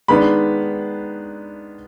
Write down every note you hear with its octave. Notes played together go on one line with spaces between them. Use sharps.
D#3 G#3 B3 D4 B5